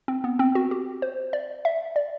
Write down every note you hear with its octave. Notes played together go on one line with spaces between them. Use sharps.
C4
B3
C4
F#4
G4
C5
D5
E5
D5